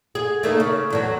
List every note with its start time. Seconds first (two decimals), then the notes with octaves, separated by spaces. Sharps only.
0.15 G#4
0.43 A3 A#3 D#4
0.60 C#3
0.90 E2 A2 F#3